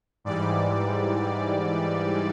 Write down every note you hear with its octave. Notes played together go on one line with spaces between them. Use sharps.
G#2 E3 G3 D5